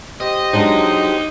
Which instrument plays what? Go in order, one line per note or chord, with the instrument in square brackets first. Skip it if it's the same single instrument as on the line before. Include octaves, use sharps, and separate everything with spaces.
[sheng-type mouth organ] G4 C5 [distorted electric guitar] D#5
[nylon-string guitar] F#3 G#3 D4 [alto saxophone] D#4